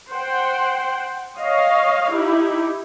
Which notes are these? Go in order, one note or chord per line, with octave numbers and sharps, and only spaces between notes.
C5 F#5 G5
C#5 D#5 F5
D#4 E4 G4